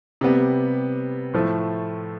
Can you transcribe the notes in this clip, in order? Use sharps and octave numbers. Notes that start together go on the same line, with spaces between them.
C3 G3 B3
A2 F3 A3